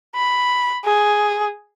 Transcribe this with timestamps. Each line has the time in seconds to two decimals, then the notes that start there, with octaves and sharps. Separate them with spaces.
0.15 B5
0.85 G#4